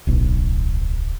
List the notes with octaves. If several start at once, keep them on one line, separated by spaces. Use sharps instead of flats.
D1 B1